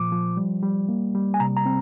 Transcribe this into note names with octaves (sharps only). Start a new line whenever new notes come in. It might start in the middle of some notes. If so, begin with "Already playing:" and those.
Already playing: A#2 F3 D6
F3
G3
G3
A#3
G3
G#5
C3 A#5
A#5
C4